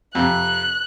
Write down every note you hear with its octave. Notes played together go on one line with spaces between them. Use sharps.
F2 C3 F#6